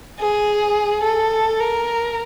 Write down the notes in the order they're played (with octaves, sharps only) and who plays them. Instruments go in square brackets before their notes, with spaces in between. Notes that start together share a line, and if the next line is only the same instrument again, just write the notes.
[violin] G#4
A4
A#4